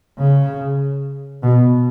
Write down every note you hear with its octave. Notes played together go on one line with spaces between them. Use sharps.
C#3
B2